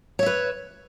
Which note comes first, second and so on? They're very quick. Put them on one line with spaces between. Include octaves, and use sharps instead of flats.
C#5 E5 B4